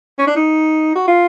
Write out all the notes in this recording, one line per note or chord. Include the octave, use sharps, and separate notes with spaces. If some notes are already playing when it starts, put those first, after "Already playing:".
C#4
D4
D#4
F#4
F4